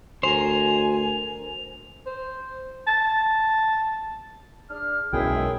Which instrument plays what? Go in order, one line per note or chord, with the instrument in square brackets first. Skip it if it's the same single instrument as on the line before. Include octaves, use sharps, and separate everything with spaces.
[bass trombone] D2 [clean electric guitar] A#4 C5 [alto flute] G#5 [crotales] F7
[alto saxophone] C5
A5
[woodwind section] D4 G#4 F6
[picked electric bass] B1 [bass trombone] F#2 [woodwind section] G#3 E4 [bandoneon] G#4 G5